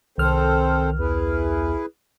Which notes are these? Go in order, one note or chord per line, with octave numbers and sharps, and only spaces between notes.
C2 D#3 C4 A4 C5 F6
E2 E4 G#4 B4